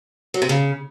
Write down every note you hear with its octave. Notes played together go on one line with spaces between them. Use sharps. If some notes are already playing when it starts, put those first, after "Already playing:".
F#3
C3
C#3